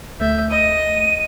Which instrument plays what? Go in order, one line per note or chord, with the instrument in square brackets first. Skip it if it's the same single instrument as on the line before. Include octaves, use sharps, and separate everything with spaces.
[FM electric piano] D2 A3 [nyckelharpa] E5 [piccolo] G6
[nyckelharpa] D#5 [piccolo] D#7